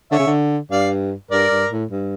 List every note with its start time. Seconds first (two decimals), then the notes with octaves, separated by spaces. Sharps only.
0.11 D3 C#5 E5
0.19 C#3
0.26 D3
0.71 G2 D5 F5
1.31 G2 A#4 D5
1.51 G2
1.71 A2
1.91 G2